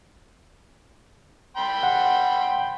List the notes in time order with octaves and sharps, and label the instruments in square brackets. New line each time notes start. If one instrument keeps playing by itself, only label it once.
[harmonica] G5 B5 C6
[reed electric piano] F#5